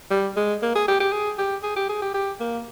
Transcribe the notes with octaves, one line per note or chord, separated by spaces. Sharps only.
G3
G#3
A#3
G#4
G4
G4
G#4
G4
G#4
G4
G#4
G4
G4
A#3